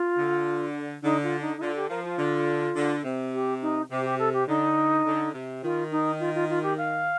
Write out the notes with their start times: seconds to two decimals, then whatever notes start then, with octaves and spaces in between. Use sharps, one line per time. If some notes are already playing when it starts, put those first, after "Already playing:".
Already playing: F4
0.17 D3
1.03 D3 D#4
1.22 F4
1.41 D#4
1.57 D#4
1.61 D3 F4
1.75 G4
1.89 F3 A#4
2.03 F4
2.18 D3
2.75 D3
3.04 C3
3.33 G4
3.61 D#4
3.90 C3 G4
4.04 G4
4.18 A4
4.33 G4
4.47 D3 D#4
5.05 D3
5.34 C3
5.63 D#3 F4
5.91 D#4
6.19 F4
6.34 F4
6.49 F4
6.62 G4
6.77 F5